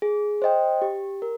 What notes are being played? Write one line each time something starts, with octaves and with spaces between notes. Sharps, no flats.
G#4
C5 D#5 G5
G4
A#4